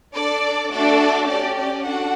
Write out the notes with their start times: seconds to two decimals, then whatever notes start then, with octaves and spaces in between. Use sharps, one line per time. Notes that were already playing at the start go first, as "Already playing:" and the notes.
0.14 D4 A4 D5
0.71 A3 D4 F#4 A4 D5
1.27 C#4 G4 D5
1.56 D5
1.84 D4 F#4 A4 F#5